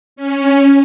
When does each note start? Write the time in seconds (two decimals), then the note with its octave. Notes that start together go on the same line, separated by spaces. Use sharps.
0.16 C#4